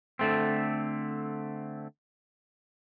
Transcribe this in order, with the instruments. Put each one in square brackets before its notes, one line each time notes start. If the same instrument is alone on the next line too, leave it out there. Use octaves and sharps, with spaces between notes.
[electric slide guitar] D3 A3 C4